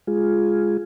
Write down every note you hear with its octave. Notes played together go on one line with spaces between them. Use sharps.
G#3 F4 G#4